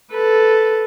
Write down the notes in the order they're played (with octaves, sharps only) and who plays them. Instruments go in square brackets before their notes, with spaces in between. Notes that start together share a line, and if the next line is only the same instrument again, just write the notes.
[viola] A4 B4